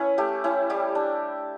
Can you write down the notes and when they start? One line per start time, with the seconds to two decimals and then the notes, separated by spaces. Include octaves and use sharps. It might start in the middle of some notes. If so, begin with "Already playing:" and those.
Already playing: C#4 E4 B4 C#5
0.18 A3 G4
0.44 C#4 E4
0.70 G3 G4
0.95 D4